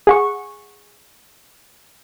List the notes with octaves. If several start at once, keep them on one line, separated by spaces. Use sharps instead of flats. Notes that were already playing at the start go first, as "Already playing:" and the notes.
G#4 F#5 C#6